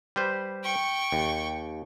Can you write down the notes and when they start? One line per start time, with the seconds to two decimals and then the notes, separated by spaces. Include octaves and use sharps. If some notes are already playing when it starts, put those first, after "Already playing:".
0.16 G3 B4 C5
0.63 G5 C#6
1.12 D#2